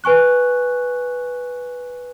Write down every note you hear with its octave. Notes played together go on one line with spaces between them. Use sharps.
B4 G#5 C#6 F#6